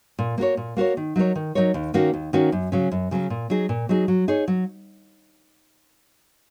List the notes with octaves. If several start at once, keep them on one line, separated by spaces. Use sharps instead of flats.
A#2
A#3 F#4 A#4 C#5
A#2
A#3 F#4 A#4 C#5
D#3
F#3 D#4 A#4 C#5
D#3
F#3 D#4 A#4 C#5
D#2
D#3 A#3 C#4 F#4
D#2
D#3 A#3 C#4 F#4
F#2
C#3 F#3 C#4
F#2
C#3 F#3 C#4
A#2
F#3 D#4 G#4
A#2
F#3 D#4 G#4
F#3
D#4 G#4 C#5
F#3